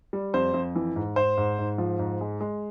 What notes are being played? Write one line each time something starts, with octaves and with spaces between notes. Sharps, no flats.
G3
F2 C5
F2
E3
G#2
G#2 C5
G#2
G#2
F3
G#2
G#3
G#3